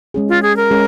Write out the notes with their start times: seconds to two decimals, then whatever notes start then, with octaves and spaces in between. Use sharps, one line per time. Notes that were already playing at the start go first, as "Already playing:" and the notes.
0.14 G#3 C#4 G#4
0.29 F4
0.43 G#4
0.57 A#4
0.70 G#3 C#4 G#4